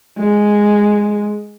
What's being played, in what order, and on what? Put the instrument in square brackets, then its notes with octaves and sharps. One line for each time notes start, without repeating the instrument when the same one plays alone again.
[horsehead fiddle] G#3